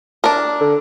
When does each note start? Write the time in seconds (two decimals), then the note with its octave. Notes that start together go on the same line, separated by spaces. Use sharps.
0.24 D4 A#4
0.60 D3